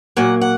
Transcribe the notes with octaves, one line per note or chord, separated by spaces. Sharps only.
A#2 F#3 A#3 F#5
F#5